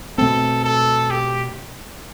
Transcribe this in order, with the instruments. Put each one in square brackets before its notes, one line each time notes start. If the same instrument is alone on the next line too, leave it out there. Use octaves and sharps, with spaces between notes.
[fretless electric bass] B2 A3 C4 [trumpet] A4
[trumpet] A4
G4